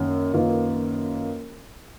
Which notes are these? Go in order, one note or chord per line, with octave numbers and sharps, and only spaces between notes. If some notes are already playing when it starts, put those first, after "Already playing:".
Already playing: F#2 D#3 A#3
F#2 D#3 A#3 F4 B4